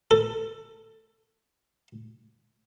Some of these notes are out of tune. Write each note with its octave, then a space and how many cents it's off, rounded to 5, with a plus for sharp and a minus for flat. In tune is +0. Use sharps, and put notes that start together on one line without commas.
A4 +20